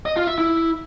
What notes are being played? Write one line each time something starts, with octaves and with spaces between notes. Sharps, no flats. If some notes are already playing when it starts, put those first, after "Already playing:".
D#5
F4
E5
E4